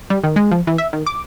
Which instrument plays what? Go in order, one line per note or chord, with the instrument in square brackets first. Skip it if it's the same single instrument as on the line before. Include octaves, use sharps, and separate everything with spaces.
[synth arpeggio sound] G3
D#3
G#3
F3
E3
E5
D#3
D6